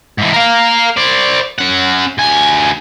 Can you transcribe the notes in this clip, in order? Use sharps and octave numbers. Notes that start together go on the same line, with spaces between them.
G#2 E3
A#4 F5
C5 D5
C#4 F#5
D2 G#5